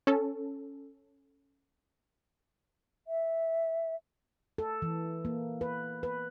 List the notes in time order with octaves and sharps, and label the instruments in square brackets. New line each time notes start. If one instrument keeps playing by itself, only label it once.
[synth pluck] C#4 A4
[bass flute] E5
[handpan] A4
E3
A#3
B4
B4